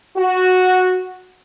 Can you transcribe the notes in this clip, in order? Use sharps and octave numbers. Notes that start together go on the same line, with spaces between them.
F#4